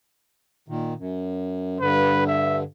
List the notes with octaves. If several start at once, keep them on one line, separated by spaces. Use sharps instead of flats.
A#2 D#3
F#2
G2 D3 B4
E5